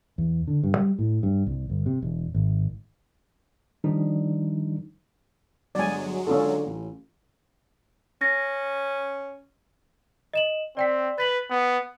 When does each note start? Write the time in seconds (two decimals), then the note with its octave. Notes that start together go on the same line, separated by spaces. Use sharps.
0.18 E2
0.47 D3
0.64 G2
0.77 G3
0.99 A2
1.23 G2
1.46 C2
1.70 G1
1.86 C3
2.02 E1
2.34 G#1
3.84 D#3 F3 G3 D4 D#4
5.75 G1 F#3 G#3 D5 G#5
6.27 D3 C#4 F4 A4
6.66 A1
8.21 C#4 A#6
10.34 D#5 E7 F#7
10.77 C4 D5 G5 B6
11.18 B4 A6 B6 F#7
11.51 B3